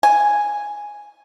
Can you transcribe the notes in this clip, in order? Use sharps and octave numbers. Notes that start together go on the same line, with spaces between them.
G#5